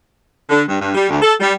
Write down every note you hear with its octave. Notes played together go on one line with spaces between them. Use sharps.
D3
G2
G2
G3
D2
A4
G3